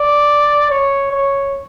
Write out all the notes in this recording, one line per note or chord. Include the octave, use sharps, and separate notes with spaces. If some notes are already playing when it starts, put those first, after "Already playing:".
Already playing: D5
C#5
C#5